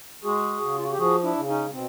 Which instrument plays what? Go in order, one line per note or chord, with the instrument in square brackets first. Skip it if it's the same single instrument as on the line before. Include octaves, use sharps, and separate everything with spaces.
[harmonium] G#3 F#4 G#4
C#3
F4
F#4
G4
F3 F#4 G#4
D4 E4
C#3
C#4 D#4
B2 C4